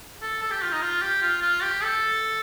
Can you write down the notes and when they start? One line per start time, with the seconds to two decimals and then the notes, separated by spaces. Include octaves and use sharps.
0.22 A4
0.42 A4
0.51 G4
0.62 F4
0.72 D#4
0.82 F4
1.02 G4
1.22 F4
1.41 F4
1.62 G4
1.83 A4